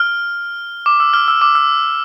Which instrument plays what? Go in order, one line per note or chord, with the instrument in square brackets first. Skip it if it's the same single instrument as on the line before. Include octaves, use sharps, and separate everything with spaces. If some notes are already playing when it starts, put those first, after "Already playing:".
Already playing: [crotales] F6
D6
E6
F6
E6
D6
E6